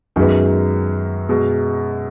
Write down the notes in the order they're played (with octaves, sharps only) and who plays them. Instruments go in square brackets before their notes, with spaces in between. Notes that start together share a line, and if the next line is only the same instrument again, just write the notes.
[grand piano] F#2 [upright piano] D#3 G#3 B3
[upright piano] B2 G#3